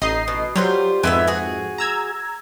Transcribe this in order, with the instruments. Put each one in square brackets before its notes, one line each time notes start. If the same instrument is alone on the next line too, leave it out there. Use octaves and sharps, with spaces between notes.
[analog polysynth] A1 D#5 C7 [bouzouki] D#4
[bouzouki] B2
[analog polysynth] F#3 [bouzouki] G3 F4 C5
[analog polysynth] F2 G#2 [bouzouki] E3 B3 E5
[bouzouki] F#4 G#4
[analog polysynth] A#5 E6 G#6